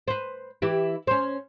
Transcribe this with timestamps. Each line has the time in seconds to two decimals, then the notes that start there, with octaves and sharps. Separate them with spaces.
0.08 B4 C5
0.62 E3 E4 G4
1.07 C#4 C5